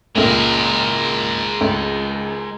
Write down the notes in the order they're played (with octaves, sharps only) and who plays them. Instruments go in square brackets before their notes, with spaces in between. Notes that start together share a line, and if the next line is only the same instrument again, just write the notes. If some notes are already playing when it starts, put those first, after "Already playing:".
[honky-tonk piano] C#2 A#2 [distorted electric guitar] G#3 A#4
[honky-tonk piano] C#2